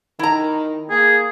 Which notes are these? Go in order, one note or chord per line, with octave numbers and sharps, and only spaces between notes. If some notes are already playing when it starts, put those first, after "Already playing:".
D#3 E4 A#5
A#3 G#4